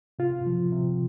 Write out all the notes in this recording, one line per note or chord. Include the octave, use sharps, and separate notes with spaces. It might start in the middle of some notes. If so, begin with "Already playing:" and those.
C3 F4
F3
C3